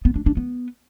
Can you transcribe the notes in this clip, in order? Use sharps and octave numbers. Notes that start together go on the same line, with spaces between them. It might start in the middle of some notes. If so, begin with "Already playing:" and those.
B3
D4
D4
B3